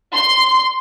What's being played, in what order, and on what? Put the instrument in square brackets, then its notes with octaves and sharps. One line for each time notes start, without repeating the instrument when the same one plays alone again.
[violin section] C6